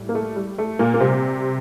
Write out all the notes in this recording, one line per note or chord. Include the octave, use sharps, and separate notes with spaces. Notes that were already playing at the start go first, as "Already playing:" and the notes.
Already playing: A2 G3
A#3
A3
G3
A3
A#2 A#3
A#3
C3 G3 C4